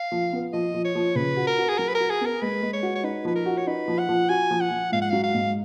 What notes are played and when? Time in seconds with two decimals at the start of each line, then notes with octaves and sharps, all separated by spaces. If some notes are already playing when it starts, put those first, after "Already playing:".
Already playing: F5
0.12 F3
0.33 B3
0.53 F3 D#5
0.74 F3
0.85 C#5
0.95 F3
1.15 C#3 B4
1.37 F#4
1.47 A#4
1.58 F#4
1.69 G#4
1.78 F#3 A#4
1.89 B4
1.95 A#4
2.00 F#4
2.10 G#4
2.21 B3 A#4
2.42 G#3 B4
2.63 G#3
2.73 C#5
2.83 F#4
2.95 C#5
3.04 D#4 B4
3.25 F3 B4
3.35 A#4
3.46 F#4
3.58 C#5
3.67 D#4 B4
3.88 F3
3.99 F#5
4.09 F3
4.29 F#4 G#5
4.51 F3
4.61 F#5
4.71 F3
4.92 G#2 F5
5.02 F#5
5.10 F#3 F5
5.24 F5
5.34 G#2